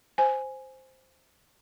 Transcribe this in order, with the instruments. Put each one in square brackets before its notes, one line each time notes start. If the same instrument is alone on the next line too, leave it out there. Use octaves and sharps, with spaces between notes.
[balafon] C5 G#5